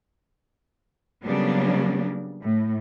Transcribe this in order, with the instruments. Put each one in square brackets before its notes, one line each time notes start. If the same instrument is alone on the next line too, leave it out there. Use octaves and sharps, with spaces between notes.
[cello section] C#3 F#3 G3 A#3 B3 D4
A2